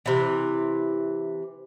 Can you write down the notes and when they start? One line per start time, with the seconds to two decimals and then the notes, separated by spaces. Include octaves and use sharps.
0.06 C3 E3